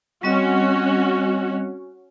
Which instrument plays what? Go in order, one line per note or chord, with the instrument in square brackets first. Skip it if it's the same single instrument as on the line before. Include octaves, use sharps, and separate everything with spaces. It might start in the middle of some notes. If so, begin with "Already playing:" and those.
[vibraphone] G3 C4 D#5 [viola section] C#4 F#4